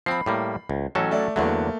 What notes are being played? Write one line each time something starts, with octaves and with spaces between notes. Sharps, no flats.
F3 C4 B5 C7
A2 G3 A#3
C#2
A1 F#3 C#4 A4
A3 D5
E2 D3 F#3 A3 A#3